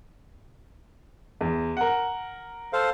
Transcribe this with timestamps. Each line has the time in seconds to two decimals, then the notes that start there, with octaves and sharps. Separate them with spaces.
1.41 E2
1.77 A#4 F#5
2.73 A4 C5 F5